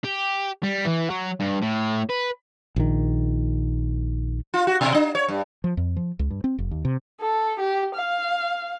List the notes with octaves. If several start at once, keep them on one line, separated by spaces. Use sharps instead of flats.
G4
G3
E3
F#3
G2
A2
B4
A#1 D#3
F4
F#4
B2
D4
C#5
G2
F3
F2
F3
C#2
G2
C4
F1
D#2
C3
A4
G4
F5